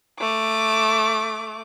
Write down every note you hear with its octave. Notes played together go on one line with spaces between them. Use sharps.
A3 D6